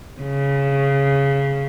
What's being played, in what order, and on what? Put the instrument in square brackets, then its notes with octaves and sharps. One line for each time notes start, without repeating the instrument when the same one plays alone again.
[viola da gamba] C#3